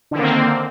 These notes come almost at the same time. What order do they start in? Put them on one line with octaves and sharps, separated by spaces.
D3 D#3 A#3 C4